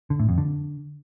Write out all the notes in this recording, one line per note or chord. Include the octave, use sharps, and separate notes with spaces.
D3
A2
F2
D3